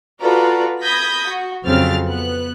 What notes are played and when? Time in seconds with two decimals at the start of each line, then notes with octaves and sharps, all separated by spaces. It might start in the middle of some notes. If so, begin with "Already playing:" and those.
0.19 F4 F#4 A4 B4 D5 A#5
0.80 B5 D#6 G6 G#6 A#6 B6
1.28 F#4
1.65 F2 C#3 F#3 C4 F6 A6
2.06 B3 F#6